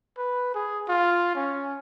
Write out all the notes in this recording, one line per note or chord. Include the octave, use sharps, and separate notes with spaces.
B4
G#4
F4
C#4